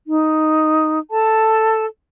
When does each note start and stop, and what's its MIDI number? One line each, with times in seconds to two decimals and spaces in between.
0.06 0.99 63
1.11 1.85 69
1.11 1.85 81